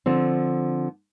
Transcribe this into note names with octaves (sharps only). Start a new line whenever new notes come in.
D3 F3 C4